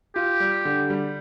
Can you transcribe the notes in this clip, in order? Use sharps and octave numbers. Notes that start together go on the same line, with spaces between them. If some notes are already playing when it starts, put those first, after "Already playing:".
F4 G4
G3
D3
G3